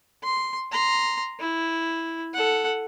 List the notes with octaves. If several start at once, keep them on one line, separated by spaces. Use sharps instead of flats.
C6
A#5 C6
E4
A4 F#5